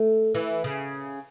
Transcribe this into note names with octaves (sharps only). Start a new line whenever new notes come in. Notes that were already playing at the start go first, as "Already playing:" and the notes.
Already playing: A3
E3
C#3